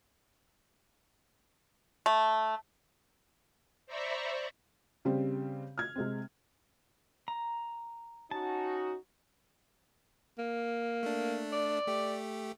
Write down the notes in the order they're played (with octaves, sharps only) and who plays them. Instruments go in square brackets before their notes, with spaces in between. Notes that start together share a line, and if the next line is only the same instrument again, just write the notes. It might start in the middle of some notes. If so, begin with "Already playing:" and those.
[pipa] A3
[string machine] C5 D5 E5 A#5 B5 C#6
[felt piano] C#3 G3 C4
F6 G#6
C3 G#3 C4
[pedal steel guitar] A#5
[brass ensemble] C#4 D#4 F#4 [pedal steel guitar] A5
[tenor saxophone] A#3
[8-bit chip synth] A3 D4
[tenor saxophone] D5
[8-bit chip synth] A3 G4